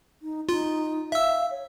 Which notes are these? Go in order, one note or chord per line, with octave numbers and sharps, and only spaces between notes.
D#4
D#4 F4
E5 F5 E6
C#5